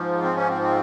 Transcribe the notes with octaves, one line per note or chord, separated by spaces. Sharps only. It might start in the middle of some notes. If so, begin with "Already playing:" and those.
Already playing: G#2 F3
C4
C#4
C4
C4